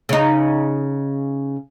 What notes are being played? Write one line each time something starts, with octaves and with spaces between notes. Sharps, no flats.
C#3 D#4